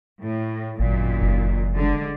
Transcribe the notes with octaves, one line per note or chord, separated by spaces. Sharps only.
A2
G#1 F#2 A#2 D#3
F#1
D3 G#3